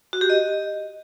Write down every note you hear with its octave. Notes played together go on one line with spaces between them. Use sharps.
F#4
G4
D#5